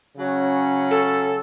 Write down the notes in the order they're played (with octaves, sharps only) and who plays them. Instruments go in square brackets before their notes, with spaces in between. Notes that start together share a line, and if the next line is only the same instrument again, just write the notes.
[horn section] C#3 F#3 C#4
[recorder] A4